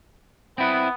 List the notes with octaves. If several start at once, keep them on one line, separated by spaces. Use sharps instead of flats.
B3 C4 E4